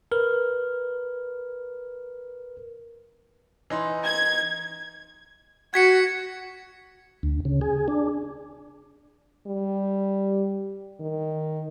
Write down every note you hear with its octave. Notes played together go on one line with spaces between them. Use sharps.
A#4 B4 F6
E3 D#4 C6
G#6
F#4 G#6 B6 C#7
D2
C#3
G#4
D4
G3
D#3